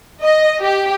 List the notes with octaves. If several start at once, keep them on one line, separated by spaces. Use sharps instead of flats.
D#5
G4